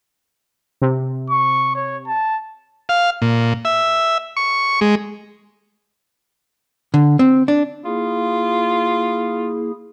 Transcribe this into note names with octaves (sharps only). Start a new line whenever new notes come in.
C3
C#6
C#5
A5
F5
A#2
E5
C#6
G#3
D3
C4
D4
A#3 E4 F4 G#4